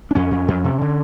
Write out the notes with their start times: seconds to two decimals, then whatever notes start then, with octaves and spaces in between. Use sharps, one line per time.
0.11 D4
0.15 F2 C#4
0.31 F2
0.48 F2
0.64 C3
0.81 D3